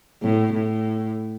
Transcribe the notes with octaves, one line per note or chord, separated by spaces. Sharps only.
A2
A2